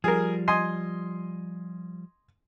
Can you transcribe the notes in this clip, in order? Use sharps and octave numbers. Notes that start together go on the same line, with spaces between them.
F3 G3 G#4 A#4
D#5 G#5 C6